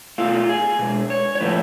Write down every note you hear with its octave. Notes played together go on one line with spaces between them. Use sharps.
B2 A3 F4
G#4
B2 G#3
C#5
C#5
A2 F3 A3 B4